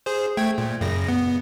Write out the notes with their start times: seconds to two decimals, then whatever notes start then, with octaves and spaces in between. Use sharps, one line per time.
0.06 G#4 C5
0.37 A3 G5 G#6
0.58 A#2
0.81 F#2 C#3 A#6
1.08 B3